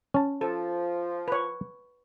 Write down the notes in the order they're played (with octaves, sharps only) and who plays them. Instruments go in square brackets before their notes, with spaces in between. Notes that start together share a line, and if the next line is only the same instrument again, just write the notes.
[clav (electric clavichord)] C#4 A5
[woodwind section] F3 [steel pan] A4
[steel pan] B4 C#5